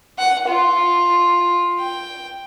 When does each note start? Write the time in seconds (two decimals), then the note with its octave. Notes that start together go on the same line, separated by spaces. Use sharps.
0.18 F#5
0.48 F4
1.79 G5